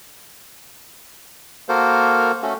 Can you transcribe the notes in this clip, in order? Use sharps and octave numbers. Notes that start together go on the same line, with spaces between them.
A#3 F#4 A4 A#4 C5
A3 C#4 F#4 A4